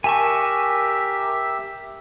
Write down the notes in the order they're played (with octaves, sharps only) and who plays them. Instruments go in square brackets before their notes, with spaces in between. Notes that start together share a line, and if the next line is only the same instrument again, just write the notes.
[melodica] G4 E5 [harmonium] A#4 [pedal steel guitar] G#5 A5 C#6